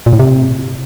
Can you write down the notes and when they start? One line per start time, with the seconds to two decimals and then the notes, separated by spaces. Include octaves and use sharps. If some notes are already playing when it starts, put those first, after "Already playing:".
0.06 A#2
0.13 A2
0.19 C3